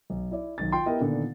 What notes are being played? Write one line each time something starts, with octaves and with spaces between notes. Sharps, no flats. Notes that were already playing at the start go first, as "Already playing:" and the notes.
B1
E4 D5
B1 D#3 A6
F4 G5 C6
B3 E4 G4 A#4 D#5 G5
A#2 D3 D#3 B3